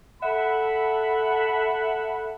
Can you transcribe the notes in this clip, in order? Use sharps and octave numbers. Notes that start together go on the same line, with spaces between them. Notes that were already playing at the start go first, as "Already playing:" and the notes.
A4 E5 F#5 B5